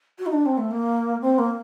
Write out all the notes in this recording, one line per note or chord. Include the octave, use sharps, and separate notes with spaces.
F#4
D#4
D4
C4
A3
A#3
C4
A#3